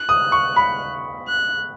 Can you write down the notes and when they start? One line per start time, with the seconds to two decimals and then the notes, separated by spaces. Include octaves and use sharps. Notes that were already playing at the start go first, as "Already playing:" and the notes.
Already playing: F#6
0.09 D#6
0.32 C#6
0.56 B5
1.28 F#6